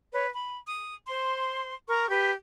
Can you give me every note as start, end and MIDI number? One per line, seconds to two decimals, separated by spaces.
0.12 0.27 71
0.12 0.27 73
0.34 0.57 83
0.67 0.95 87
1.08 1.72 72
1.08 1.72 84
1.87 2.08 70
1.87 2.08 82
1.87 2.08 85
2.09 2.30 67
2.09 2.30 71